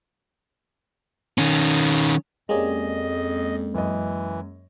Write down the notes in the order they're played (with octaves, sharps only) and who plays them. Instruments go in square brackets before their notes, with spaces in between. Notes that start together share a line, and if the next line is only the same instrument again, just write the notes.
[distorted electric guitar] D#3 C#4
[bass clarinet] F2 [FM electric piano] G#3 A#3 C#4 [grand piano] G4 G#4 D5 [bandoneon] D#5
[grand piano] F#2 D#5 [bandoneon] E3